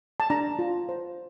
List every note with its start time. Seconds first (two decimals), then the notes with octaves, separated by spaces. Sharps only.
0.20 A5
0.30 D4 A#5
0.59 F4
0.89 C5